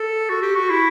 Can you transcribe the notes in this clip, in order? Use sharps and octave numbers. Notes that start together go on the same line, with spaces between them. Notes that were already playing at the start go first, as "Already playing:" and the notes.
Already playing: A4
F#4
G4
F#4
E4